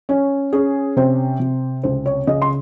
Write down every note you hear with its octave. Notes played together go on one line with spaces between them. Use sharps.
C#4 C#5
C#4 G#4
C3 C5
C3
C#2 C5
C#5
C#3 D#5
C6